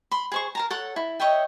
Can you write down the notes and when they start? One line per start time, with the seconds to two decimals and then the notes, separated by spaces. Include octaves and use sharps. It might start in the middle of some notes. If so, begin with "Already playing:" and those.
0.11 B5 C6
0.32 G#4 C5 C#6
0.55 A#4 A5 A#5
0.71 A4 C#5 F#5
0.96 E4
1.20 C#5 D#5 E5 G5